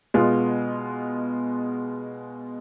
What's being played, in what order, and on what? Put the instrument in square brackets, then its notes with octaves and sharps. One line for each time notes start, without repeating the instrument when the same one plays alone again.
[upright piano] B2 G#3 B3 F4